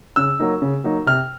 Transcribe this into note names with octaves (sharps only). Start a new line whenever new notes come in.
C#3 E6
F#3 A#3 D#4
C#3
F#3 A#3 D#4
C3 F6